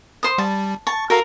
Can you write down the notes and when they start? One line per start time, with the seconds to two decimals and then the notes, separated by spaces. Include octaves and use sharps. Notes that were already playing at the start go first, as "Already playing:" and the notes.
0.23 C5 D#6
0.38 G3 A5
0.87 A5 C#6
1.10 F#4 A4 A#4 F5